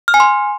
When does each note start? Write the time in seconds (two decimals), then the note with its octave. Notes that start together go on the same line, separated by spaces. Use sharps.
0.08 F6
0.14 G#5
0.20 C6